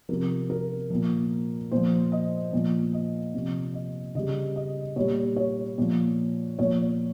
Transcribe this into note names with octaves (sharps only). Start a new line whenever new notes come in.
C3 F3 A#4
A#4
A#2 F3
A#2 F3 C5
D#5
A#2 F3
D#5
C3 F3
D#5
C#3 G3 D#5
D#5
A#2 G3 C#5
C#5
A#2 F3
A#2 F3 C#5